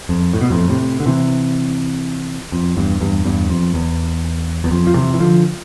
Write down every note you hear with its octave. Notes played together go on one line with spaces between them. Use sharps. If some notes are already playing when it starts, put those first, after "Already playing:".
F2
A2
B2
F2 A2
A2 C3
D3
C3 E3
F2
E2 G2
E2 G2
E2 G2
F2
E2
E2
F2
F3
C3 E3
E3
D3 F3